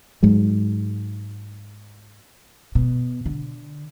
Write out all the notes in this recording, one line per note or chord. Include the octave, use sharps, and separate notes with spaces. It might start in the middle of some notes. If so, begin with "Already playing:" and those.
G#2 F#3 G#3
B2
D3